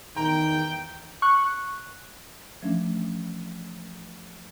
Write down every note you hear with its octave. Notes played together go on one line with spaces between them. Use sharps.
E2 D#3 G5 A#5
C#6 F#6
E3 F3 A3 C#4 D4